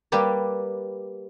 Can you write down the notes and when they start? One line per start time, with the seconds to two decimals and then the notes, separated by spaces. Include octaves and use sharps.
0.12 G3 A#3 G4 B4 D5